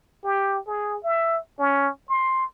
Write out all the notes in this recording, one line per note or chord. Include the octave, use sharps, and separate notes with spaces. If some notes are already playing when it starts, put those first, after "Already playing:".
G4
G#4
E5
C#4
C6